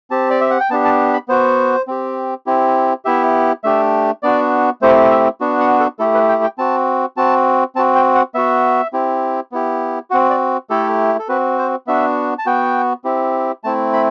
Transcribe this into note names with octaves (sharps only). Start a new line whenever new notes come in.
C4 G4 A5
D5
E5
F#5
G5
B3 D4 G4 A5
A5
B5
B3 F#4 C5
C4 G4
C4 E4 G4
B3 E4 G4 E5
A3 D4 G4 E5
B3 D4 F#4 D5
A3 C4 E4 G4 C5
E5
B3 D4 F#4
F#5
A4
A3 E4 G4 A4
B4
G5
G5
C4 F#4 A5
C4 F#4 A5
C4 F#4 A5
G5
F#5
B3 F#4 E5
C4 E4 G4
B3 E4 G4
C4 F#4 F#5
D5
A3 E4 G4 A4
A4
C4 F#4 B4
C5
B3 D4 F#4 E5
A5
B3 F#4 G5
C4 E4 G4
A3 C4 E4 A5
B5